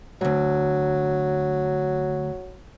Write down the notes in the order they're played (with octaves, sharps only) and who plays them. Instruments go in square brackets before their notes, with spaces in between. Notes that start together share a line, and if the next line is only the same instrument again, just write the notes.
[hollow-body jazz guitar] D2 G2 [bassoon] F#3